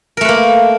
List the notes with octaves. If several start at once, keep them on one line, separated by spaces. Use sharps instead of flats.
A3 A#3 A#4 B4